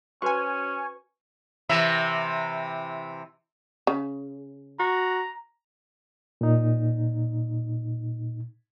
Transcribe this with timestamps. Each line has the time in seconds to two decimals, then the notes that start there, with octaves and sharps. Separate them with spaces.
0.22 C#4 F#4 B4 C5 G#5 C#6
1.69 C3 E3 E5
3.87 C#3
4.80 F#4 A#5
6.41 A#2 D#4